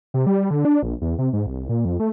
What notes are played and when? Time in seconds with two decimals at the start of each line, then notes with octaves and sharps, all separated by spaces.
0.14 C3
0.27 G3
0.51 D3
0.65 D4
0.83 A#1
1.01 E2
1.18 C3
1.33 G#2
1.47 C2
1.69 A#2
1.85 F2
2.00 A3